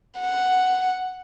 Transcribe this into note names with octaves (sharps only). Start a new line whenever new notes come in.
F#5